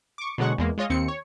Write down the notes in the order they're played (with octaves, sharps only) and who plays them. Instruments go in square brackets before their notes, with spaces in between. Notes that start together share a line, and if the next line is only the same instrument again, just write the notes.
[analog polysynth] C#6 D6
B2 D3 F#3 G#3 F#5 C#6
E2 G#3 A#3
G#3 F4 C#5 D#5
D#2 C4 C#7
C#5